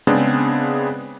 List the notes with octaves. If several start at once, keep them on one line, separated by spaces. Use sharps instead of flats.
C#3 G#3 B3 C4 D4 G#4